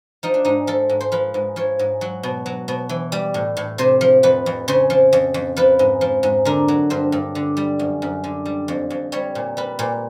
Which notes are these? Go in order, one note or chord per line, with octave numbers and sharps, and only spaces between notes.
F3 D#4
D4
G#2 D#4
F3 A4
G#2
C5
F3 B4
G#2
F3 C#5
G#2
F#3
B2
F#3
B2
E3
G3
A2
A2
C3 C5
F3
F2 B4
F2
C#3 C5
F3
F2
F2
F3 B4
G#2
F3
G#2
D3 A#4
F#3
G2 C5
G2
D3
G3
F#2
F#2
D3
G3
F2
F2
G3 C#5
A#2
G3 B4
A#2